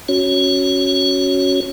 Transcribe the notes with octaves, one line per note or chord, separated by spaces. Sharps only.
C#4 F#4 C#5